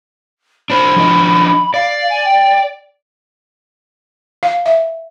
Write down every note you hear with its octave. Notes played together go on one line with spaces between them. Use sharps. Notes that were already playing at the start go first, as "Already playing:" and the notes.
D4 C5 B5
F3 D4 D#5
D5 F5
G#5
G5
F5
E5